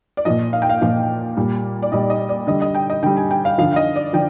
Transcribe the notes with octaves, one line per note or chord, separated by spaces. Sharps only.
D5
A#2 F3 D#5
F5
G5
F5
A#2 F3 F5
A#2 G3
D5
A#2 G3 D#5
D#5
D5
D3 G3 D#5
D#5
G5
D#5
D3 G3 G5
G#5
G5
F5
D3 F3 F5
F5
D#5
D5
D3 F3 G5